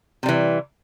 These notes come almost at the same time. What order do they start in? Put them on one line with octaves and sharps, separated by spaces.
C3 G3 E3